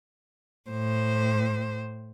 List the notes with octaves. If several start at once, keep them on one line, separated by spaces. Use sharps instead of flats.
A2 C5